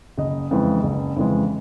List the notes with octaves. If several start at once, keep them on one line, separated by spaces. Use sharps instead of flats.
F#1 D#5
F2 C#3 E3 G#3
F#1
F2 C#3 E3 G#3